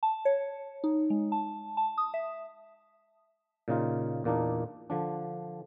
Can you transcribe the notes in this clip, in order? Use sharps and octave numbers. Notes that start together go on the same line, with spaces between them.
A5
C#5
D#4
G#3
A5
A5
D#6
E5
A#2 C#3 D#4 F4
E2 A#2 A#3 D4 D#4
D3 F3 D4